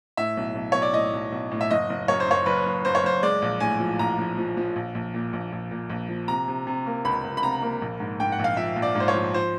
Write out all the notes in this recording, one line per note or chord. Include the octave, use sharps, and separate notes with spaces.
A2 E5
B1
B1
B1 C#5
D5
A2 D#5
B1
B1
A2
E5
F#1 D#5
F#1
F#2 C#5
C5
F#1 C#5
F#1 B4
F#1
F#1 C5
C#5
F#1 C5
G#3 D5
A#1
A2 G#5
F3
A#1 A#5
F3
F3
F3
A#1
A#1
A#2
A#1
A#1
A#2
A#1
F3
C3 A#5
C3
C3
A#3
C#2 B5
C#2
B5
C3 A#5
A#3
A#1
G#2
G#2 G5
F#5
A#1
F5
F3 E5
A#1
D5
G#2 C5
C#5
F3
F3 C5